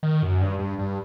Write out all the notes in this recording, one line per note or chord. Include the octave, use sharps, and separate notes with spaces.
D#3
F#2
G2
G2
G2